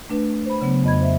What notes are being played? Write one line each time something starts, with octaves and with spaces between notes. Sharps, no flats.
A3 D4 B4
C5 B5
C#3 F#3 B3
F2 D#5 B5 G#6
C5 E5